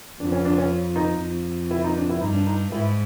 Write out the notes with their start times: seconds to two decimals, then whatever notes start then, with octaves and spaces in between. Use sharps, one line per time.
0.20 F2 D4
0.32 C#4
0.45 D4
0.58 C#4
0.96 D#4
1.20 F2
1.71 E4
1.84 D#4
1.97 D4
2.09 E4
2.21 G2 D#4
2.34 D4
2.47 D#4
2.72 G#2 E4